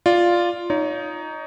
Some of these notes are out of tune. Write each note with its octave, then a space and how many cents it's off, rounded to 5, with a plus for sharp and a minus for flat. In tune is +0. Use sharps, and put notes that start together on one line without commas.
F4 +0 D5 +0
D#4 +0 C#5 +35